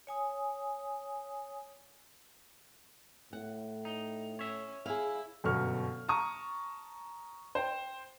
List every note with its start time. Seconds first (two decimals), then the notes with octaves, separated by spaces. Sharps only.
0.07 C#5 G#5 D#6
3.33 A2 F#5
3.85 D#4
4.39 C#4 C#5 E5
4.86 E4 G#4 F5
5.44 G1 F#2 B2 C#6 F6
6.08 A5 A#5 C#6 D#6
7.55 C5 G5